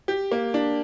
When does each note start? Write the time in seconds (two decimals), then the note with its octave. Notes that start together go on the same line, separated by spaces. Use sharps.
0.08 G4
0.31 A#3
0.54 D4